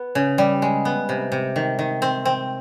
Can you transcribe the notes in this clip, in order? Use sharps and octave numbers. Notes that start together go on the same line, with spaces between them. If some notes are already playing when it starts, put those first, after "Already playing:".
Already playing: B3
C#3
G3
G#3
B3
C3
C3
D#3
D#3
C4
C4